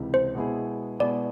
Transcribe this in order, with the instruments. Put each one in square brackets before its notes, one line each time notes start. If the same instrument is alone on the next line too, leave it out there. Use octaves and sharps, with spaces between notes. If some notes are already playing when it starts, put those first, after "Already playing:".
Already playing: [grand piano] C#2 C3 E3
[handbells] C5
[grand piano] B2 G#3 B3 E4 G#4
[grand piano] B2 G#3 B3 E4 G#4 [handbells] D5